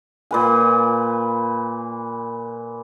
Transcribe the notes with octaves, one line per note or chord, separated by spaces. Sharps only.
A#2 B4 G#5